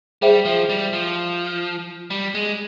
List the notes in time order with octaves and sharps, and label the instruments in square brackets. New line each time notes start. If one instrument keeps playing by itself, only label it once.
[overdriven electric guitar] G3 [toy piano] G#4 C5 E5 G5
[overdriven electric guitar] F3
G3
F3
G3
G#3